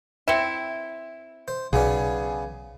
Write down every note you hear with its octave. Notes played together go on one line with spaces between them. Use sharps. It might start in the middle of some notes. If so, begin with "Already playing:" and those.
C4 E4 C#7 E7
C5
B1 C#3 B3 D4 G#4